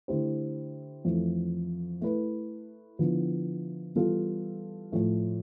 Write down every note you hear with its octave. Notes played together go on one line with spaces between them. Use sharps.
D3 A3 E4 G4 C5
F2 E3 A3
A3 E4 B4
D3 F3 B3 E4
E3 G3 B3 F4 A4
A2 F3 A3